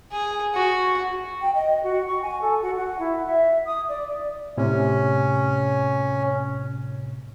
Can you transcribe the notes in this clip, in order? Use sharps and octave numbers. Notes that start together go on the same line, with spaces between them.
G#4
F#4
G5
D#5
F#4
C#6
G#5
A4
F#4
F#5
E4
E5
D#6
D5
A2 C3 C#4